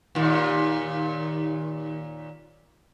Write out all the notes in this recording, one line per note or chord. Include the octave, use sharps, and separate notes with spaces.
D#2 A#2